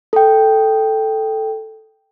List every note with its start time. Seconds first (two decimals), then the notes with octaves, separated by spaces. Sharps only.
0.13 A4 G5